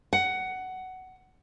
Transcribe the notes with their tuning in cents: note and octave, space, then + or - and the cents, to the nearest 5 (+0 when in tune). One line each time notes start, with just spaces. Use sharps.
F#5 +15